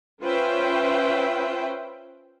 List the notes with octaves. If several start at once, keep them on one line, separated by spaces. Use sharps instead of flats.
C#4 F4 B4 C5 E5 G5